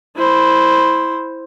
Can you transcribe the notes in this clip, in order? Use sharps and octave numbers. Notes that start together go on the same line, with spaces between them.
E4 C5